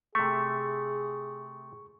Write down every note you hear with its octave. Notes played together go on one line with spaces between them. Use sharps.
C3 A3 G#4 C#6